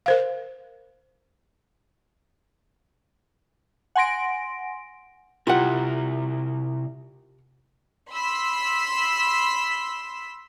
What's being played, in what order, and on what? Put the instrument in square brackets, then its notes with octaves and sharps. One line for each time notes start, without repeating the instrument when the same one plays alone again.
[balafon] A#4 C5 F5
[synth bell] F#5 G#5 C6 A#6 D7
[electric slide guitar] C3 E4 A#4 [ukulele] F4 G4 F#5
[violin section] B5 C6 E6 B6